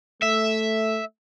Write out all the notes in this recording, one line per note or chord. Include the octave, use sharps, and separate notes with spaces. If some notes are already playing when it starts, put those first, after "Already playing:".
A3 E5